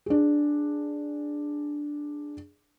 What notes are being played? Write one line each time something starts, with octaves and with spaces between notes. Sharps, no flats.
D4 G#4